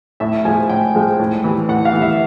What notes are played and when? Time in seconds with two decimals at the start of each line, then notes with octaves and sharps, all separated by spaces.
0.20 A2 E5
0.45 F3 G#5
0.48 G#3
0.69 A2 G5
0.95 F3 G#3
1.20 A2
1.44 E3 G3
1.69 A2 F#5
1.85 F5
1.93 E3 G3
2.02 E5